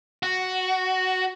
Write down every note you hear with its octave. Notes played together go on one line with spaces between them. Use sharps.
F#4